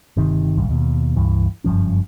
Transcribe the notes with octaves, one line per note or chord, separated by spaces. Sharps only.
G1 C3 D#3
D#1 G#1 C#2 G2
D#2 B2
C#2 G2 E3
F#1 G2 F3 C#4